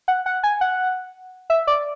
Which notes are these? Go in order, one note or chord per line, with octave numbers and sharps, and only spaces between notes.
F#5
F#5
G#5
F#5
E5
D5